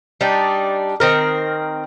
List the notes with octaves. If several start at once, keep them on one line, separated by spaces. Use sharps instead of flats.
G3 D4 D#4
D#3 C4 A#4